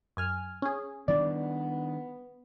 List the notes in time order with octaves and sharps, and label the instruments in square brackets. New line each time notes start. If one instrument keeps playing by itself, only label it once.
[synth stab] F#2 G#5 F6
C#4 G#4
[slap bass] D#3 G3 D4 [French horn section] B3 [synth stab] D5